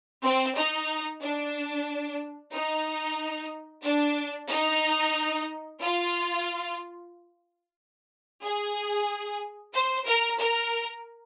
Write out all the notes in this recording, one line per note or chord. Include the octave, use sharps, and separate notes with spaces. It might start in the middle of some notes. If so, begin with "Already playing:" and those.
C4
D#4
D4
D#4
D4
D#4
F4
G#4
C5
A#4
A#4